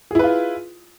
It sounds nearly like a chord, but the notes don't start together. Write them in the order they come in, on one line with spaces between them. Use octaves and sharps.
G#4 E4 B4 F4